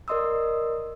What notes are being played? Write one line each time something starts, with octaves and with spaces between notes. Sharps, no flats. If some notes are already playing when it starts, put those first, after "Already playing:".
A#4 D5 D#5 C6 D#6 E6